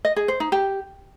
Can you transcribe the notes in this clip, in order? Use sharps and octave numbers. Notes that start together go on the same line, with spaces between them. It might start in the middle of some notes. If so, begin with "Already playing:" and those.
D#5
G#4
C5
D#4
G4